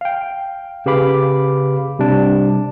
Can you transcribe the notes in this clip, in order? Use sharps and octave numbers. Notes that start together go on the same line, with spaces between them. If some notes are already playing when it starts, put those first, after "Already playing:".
F5 G5
C#3 G4 B4 F5 B5 D6
C3 G3 D4